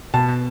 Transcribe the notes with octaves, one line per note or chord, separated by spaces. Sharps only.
B2 A5
B2